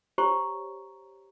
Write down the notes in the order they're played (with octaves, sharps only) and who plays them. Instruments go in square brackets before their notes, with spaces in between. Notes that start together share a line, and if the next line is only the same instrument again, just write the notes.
[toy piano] G4 C5 C#5 A#5 C#6